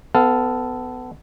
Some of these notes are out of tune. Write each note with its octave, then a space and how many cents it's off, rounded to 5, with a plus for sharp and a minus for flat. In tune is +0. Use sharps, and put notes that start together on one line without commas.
B3 +25 A4 +0 F5 +0